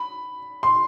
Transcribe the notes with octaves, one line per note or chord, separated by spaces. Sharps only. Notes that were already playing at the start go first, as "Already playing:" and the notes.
Already playing: B5
C6